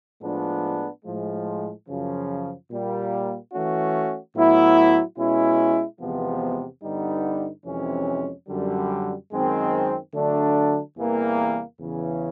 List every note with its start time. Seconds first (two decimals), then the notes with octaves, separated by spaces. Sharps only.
0.22 A2 F3 G#3 B3 D4
1.05 A2 F3 G#3
1.88 F#2 C#3 F3
2.70 A#2 G3 A#3
3.52 E3 A3 C#4 F#4
4.36 A2 F#3 B3 E4
5.18 B2 G#3 C#4 E4
6.00 E2 C3 F3 G#3 B3
6.83 G2 D3 G3 B3 D#4
7.66 F2 C3 E3 G#3 C#4
8.48 F#2 D3 G3
9.32 F#2 D#3 G#3 C4
10.14 D3 F#3 A3 D4
10.97 E2 C3 E3 G3 A#3
11.79 E2 C#3 E3